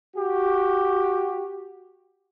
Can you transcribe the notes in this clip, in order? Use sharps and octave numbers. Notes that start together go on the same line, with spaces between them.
F#4 G4